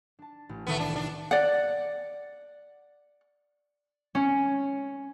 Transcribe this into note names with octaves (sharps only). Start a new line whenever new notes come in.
D4 A5
A1
C2 D#3 E3 A3 B3
D4
D4
D5 F#5
C#4